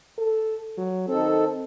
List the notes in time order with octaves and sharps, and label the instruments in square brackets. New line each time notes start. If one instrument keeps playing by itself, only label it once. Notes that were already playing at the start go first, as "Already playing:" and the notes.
[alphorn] A4
F#3
[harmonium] D#3 A4 [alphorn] C4